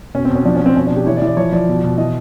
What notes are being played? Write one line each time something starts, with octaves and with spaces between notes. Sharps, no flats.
B2 C#4
C4
B2 C#4
F3 D4
C#4
F3
C4
B2 C#4
D4
B2
G4
E3 C#5
D5
E3
D5
F3 C#5
F3 D5
B2
B2
E3 D#5